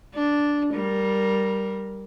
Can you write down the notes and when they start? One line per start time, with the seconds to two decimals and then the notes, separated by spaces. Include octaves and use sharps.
0.14 D4
0.74 G3 A#4